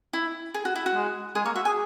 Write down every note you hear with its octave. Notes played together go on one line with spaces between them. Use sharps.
E4
G#4
F#4
E4
F#4
G#3
G#3 G#4
A#3 C#5
F#4 E5
G#4 G#5